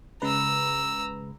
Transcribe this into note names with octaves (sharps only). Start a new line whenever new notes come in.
C#3 G#3 B4 A#5 E6